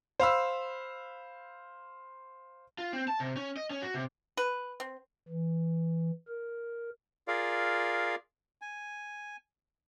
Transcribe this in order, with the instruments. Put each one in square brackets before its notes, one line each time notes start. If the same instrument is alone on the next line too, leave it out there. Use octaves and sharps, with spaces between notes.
[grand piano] C5 F5 B5 E6
[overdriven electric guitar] F4
C4
A5
C3
C#4
D#5
C#4
F#4
C3
[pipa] B4
C4
[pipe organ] E3
A#4
[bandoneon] F4 G#4 A#4 D5 F5
G#5